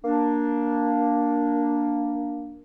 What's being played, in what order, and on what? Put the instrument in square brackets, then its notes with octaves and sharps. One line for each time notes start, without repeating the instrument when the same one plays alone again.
[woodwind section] A#3 D4